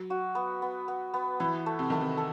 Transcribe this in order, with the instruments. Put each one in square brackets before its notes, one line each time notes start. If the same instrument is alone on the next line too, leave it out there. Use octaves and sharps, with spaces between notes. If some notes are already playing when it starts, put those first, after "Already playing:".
Already playing: [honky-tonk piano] F#3
[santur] F#4
B3
B3
B3
B3
[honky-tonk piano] E3 [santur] E4
[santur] A3
[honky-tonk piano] C3
[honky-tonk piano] D#3 [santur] A3
[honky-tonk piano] C3
[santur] A4